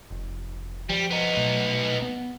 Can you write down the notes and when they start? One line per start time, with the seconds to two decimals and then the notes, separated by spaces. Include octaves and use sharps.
0.11 F1
0.90 F3 G3
1.11 B3 D#4
1.37 B2 F#3 A3
2.02 B3